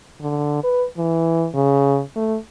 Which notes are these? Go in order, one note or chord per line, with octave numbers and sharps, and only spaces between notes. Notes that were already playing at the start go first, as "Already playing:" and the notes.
D3
B4
E3
C#3
A3